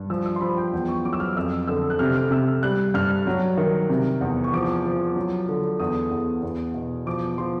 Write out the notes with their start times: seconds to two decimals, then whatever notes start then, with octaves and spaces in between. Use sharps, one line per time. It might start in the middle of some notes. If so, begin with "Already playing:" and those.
Already playing: G2
0.10 F3 E6
0.26 E6
0.36 C6
0.41 F3 B5
0.57 G5
0.73 E2 G5
0.88 C#6
1.05 F#3 D6
1.13 E6
1.20 F6
1.37 F2 E6
1.67 D3 E6
1.90 F#6
1.99 C3 F6
2.16 F6
2.31 C3 E6
2.63 G3 F#6
2.94 G2 F6
3.27 F#3
3.58 D#3
3.89 C3
4.21 E2
4.44 C#6
4.53 F3 D6
4.85 F3
5.16 F#3
5.49 D3
5.80 E2 D#6
6.11 E2
6.43 E2
6.74 B2
7.06 F3 D6
7.38 F3 C6